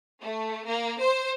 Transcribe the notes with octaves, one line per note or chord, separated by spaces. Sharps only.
A3
A#3
C5